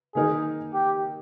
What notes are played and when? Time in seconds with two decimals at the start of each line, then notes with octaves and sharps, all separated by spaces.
0.15 D#3 A#3 D#4 G#4 A#4
0.74 G4